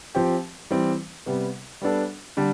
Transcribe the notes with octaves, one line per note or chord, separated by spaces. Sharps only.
F3 C4 G4
E3 G3 C4
C3 G3 B3
G3 B3 D4 A4
D3 G3 D4